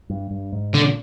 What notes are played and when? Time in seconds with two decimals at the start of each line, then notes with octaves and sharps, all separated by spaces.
0.10 G2
0.31 G2
0.52 G#2
0.74 A#2 D3